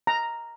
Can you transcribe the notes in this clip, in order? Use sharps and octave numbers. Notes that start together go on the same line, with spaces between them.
A#5